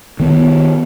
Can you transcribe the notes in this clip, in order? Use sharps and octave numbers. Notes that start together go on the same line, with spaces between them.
D#3 B3